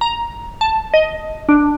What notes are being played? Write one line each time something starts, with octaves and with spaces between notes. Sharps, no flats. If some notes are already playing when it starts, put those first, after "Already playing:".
A#5
A5
D#5
D4